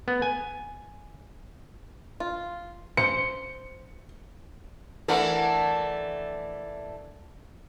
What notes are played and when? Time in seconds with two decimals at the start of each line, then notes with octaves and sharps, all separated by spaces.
0.08 B3
0.22 G#5
2.20 F4
2.97 C5 C#7
5.08 E3 A3 D4 A#4 F#5